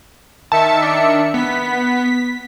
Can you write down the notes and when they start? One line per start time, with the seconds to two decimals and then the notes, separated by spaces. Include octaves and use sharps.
0.52 D#3 E5 A5 C#7
0.82 D4
1.34 B3 B6